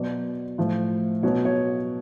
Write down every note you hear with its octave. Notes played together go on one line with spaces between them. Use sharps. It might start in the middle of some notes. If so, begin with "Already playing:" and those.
Already playing: B2 F#3 D5
A2 F3
B2 F#3 C#5
C#5